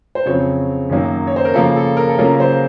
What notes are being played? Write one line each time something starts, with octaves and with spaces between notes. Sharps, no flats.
C5
F2 C#3 F#3 C4 C#5
F#2 D#3 F#3 A#3 D#4
C#5
C5
A#4
C#3 F3 A#3 A4
A4
A#4
A4
C#3 F#3 A#3 C#4 F4 A#4
C5